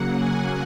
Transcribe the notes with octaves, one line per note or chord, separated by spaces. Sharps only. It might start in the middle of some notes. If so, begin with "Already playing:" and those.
Already playing: C#3 F#3 A#3 F#5
G#5